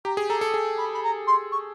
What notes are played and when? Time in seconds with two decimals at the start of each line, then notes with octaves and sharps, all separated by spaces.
0.05 G4 A#5
0.17 G#4
0.29 A4 A#5
0.41 A4
0.54 G#4
0.78 B5
0.93 B5
1.03 A#5
1.27 C6
1.51 C#6